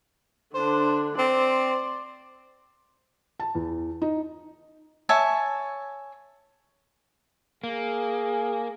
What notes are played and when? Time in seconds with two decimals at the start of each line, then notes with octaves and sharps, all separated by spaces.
0.54 D3 D4 C5
1.19 C4 D5 C6
3.40 A5
3.55 E2
4.02 D#4
5.09 C#5 E5 G#5 A5
7.64 A#3 G#4